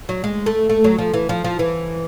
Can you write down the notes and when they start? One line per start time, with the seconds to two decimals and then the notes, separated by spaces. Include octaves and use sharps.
0.09 F#3
0.24 G#3
0.46 A3
0.69 A3
0.84 F#3
0.98 F3
1.13 E3
1.29 F3
1.44 F3
1.59 E3